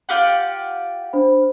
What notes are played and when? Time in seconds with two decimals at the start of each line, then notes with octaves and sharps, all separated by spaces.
0.09 F4 G4 F#5
1.13 D4 C5 B5